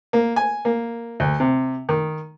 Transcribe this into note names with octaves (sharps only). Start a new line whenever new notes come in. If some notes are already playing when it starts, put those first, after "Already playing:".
A#3
G#5
A#3
D2
C3
D#3